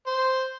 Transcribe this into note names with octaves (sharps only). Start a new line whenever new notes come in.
C5